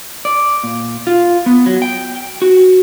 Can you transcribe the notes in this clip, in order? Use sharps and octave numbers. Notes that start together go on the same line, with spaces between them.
D5
A#2
F4
B3
F#3
G5
F#4